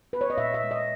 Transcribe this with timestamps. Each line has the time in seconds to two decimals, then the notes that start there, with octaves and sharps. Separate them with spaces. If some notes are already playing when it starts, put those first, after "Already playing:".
0.13 B4
0.21 C#5
0.30 D#5
0.38 A#2 E5
0.54 E5
0.63 G#3
0.71 D#5